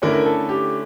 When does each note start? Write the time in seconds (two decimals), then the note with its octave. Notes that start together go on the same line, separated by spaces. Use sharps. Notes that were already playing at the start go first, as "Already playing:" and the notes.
0.02 D3 A3 C#4 E4 A#4
0.13 A#4
0.26 A4
0.49 G4